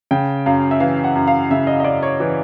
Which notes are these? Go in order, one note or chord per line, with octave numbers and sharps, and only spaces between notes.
C#3 G5
F#2 F5
E5
E3 F5
F#5
F#2
F5
C#3 E5
D#5
D#5
F#2 D5
C#5
E3